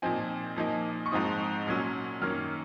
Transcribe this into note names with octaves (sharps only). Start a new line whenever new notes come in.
A#2 F3 C4 D#4 G#5
A#2 F3 A#3 D#4
C#6
G#2 F3 C4 D#4 D#6
A#2 F#3 C#4
F#2 D#3 A#3 C#4 F6